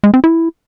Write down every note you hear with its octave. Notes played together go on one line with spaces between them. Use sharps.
G#3
C4
E4